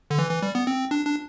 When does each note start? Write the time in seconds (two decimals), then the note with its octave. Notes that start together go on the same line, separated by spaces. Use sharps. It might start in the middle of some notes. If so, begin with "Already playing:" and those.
0.11 D3
0.19 E3
0.31 E3
0.42 G3
0.55 B3
0.67 C4
0.91 D4
1.05 D4